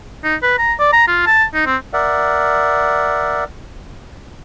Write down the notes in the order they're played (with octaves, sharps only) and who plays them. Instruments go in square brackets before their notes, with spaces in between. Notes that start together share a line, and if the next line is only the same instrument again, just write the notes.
[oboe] D#4
B4
A#5
D5
A#5
F4
A5
D#4
C4
[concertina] A#4 D5 E5 F#5